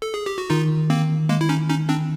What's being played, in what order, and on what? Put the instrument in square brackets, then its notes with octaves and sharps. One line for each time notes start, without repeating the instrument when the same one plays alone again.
[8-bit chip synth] A4
G#4
G4
F#4
[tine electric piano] D#3 [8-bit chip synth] D#4 F4
[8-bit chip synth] A#3 C4
G#3 A#3
E4
C#4 D#4
C#4 D#4
C4 D4